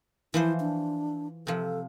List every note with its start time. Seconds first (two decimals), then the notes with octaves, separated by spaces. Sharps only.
0.34 E3 F3 E4 C5
0.60 D4
1.47 C3 F3 A4